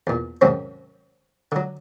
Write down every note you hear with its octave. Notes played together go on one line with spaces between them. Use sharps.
E2 A#2
D#2 G#2 C3 F#3 C4 C#4
D3 F#3